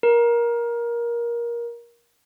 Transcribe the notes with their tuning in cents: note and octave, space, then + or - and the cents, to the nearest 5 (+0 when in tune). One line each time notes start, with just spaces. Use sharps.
A#4 +20